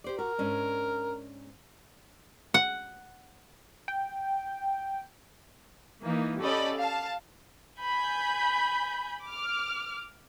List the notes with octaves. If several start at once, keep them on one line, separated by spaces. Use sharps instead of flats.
G4 C5 D5
F#4 A#4
G#2 C#4 D4
F#5
G5
E3 A#3 D#4
C#4 G4 A4 D5 D#5 B5
F5 A5
G#5 B5 G6
D6 F6